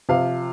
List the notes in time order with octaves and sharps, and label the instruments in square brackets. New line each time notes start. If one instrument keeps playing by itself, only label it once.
[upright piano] C3 F3 F5